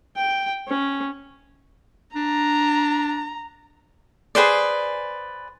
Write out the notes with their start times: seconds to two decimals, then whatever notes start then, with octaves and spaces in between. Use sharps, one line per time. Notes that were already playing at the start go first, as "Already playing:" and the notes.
0.16 G5
0.68 C#4
2.16 D4 A#5
4.35 G#4 B4 C5 D5